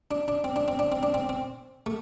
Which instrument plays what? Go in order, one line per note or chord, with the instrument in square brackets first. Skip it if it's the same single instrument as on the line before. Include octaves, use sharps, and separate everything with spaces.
[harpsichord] D4
D4
C4
D4
C4
D4
C4
D4
C4
C4
A3